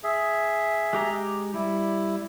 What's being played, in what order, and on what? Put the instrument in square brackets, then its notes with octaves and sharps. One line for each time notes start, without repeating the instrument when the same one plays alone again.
[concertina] G#4 E5
[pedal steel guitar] G#3 G4 A#5
[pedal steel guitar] G3 [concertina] E4